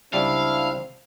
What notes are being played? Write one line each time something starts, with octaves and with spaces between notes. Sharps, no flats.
C#2 G3 C4 D4 E4 F5 A5